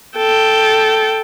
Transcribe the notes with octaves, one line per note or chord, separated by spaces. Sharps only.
A4 G5